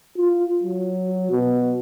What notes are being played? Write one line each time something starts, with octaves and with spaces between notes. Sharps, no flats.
F4
F#3
B2